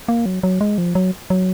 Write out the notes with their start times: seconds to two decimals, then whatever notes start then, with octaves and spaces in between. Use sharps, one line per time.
0.08 A#3
0.26 F#3
0.43 F#3
0.61 G#3
0.78 F3
0.95 F#3
1.30 F#3